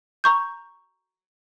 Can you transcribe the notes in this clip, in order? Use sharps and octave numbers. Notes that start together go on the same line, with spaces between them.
A#5 C#6 G6